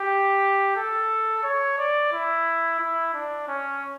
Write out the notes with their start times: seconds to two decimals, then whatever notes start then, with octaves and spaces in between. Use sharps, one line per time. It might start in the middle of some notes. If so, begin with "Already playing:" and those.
Already playing: G4
0.76 A4
1.43 C#5
1.78 D5
2.12 E4
2.79 E4
3.14 D4
3.48 C#4